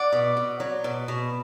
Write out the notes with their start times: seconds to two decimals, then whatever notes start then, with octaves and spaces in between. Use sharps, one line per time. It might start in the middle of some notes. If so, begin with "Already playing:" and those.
Already playing: D5 F#5
0.12 B2
0.37 B2
0.60 F#3
0.84 B2
1.08 B2